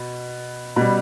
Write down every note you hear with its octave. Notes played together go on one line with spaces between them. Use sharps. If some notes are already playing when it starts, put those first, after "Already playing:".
Already playing: B2
B2 G3